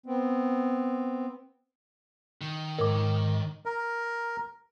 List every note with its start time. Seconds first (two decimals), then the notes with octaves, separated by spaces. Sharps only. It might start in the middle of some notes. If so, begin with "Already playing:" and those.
0.06 B3 C4
2.41 D#3
2.78 G#2 A#4 C#5 D#5 D6
3.66 A#4